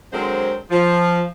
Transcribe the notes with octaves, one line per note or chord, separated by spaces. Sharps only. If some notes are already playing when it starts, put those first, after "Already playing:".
D3 F#3 G#3 C4 A#4 C5
F3